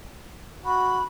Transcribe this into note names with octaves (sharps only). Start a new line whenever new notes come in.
F#4 B5